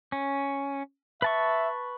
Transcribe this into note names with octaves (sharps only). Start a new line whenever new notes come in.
C#4
B4 E5 A5 C#6